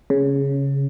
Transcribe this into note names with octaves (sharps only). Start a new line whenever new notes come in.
C#3